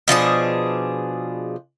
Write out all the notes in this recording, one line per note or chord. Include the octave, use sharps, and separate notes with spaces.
B2 F3 D4 G#4